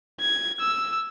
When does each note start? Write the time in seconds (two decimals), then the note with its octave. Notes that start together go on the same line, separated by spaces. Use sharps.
0.20 G#6
0.60 E6